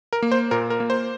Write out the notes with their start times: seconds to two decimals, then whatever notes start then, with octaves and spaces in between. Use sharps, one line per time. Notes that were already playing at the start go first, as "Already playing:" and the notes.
0.13 A#4
0.22 A#3
0.32 C5
0.51 A#2 A#4
0.70 A#4
0.80 A#3
0.90 C5